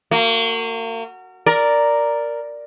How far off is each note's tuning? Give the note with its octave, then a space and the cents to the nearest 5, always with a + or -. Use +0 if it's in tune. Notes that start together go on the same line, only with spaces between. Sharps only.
A#3 -35 F#4 +0
A#4 +0 D5 +0